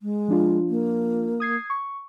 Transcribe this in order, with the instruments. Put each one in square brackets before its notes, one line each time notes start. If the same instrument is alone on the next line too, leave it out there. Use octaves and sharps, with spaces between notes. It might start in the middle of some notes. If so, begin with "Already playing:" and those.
[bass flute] G#3
[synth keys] F3 D4 F4
[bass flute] A#3
[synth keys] D#6 G#6 C7
C#6